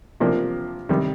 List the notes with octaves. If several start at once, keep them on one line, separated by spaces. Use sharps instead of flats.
C3 F3 A#3 D4
C3 D#3 G3